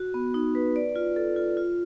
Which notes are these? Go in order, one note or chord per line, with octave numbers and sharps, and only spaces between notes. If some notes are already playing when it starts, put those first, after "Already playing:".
Already playing: F#4
B3
D#4
B4
D5
F4
A4
F4
F4